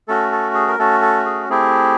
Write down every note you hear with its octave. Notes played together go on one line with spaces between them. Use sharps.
A3 C#4 F#4 A4
A4
G#4
A#4
A3 C#4 F#4 A4
A4
G#4
A3 C4 E4 G4 G#4